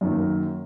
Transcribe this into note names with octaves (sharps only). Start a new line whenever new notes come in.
F#2 D#3 A#3